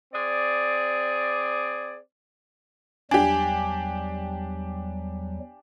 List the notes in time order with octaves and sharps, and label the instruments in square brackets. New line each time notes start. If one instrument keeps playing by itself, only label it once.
[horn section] C4 G#4 D5
[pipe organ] E2 F#3 G3 [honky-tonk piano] D4 G4 [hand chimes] G#5